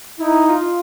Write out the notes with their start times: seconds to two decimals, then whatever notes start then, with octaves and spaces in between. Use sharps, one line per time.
0.19 D#4 E4
0.48 F4